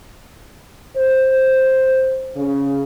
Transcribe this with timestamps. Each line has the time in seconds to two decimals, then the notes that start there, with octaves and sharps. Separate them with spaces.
0.97 C5
2.36 C#3